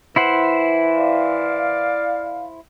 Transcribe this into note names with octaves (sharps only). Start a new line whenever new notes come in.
E3 E4 C5 F#5
D5 F5